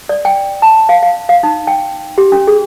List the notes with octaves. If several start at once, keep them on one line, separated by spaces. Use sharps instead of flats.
D5
G5
A5
F5
F5
F5
D#4
G5
G4
C#4
G#4